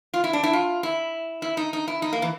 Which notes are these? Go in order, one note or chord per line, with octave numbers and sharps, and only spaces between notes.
F4
E4
D4
E4
F4
E4
E4
D#4
D#4
E4
D#4
A#3
E3